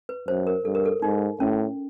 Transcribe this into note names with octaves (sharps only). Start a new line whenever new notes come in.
B4
F#2 C5
A#4
G2 A4
A#4
A4
G#2 D#4
A2 C#4